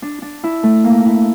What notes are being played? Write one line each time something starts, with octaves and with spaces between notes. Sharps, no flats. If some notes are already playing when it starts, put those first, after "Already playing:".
D4
D4
E4
A3
A#3
E4